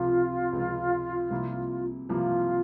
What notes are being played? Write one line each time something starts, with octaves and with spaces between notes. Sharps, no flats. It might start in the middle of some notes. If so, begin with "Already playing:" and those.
Already playing: C#2 C3 F3 F4
C#2 C3 F3
C2 C3 F3 A#3 E4
C2 C3 F3 A#3 E4 F4